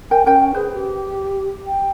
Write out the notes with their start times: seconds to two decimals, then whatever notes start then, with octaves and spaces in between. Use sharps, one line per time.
0.11 A#4 G5 G#5
0.26 C#4 A#4 G5
0.54 G#4 B4 C5
0.74 G4
1.67 G5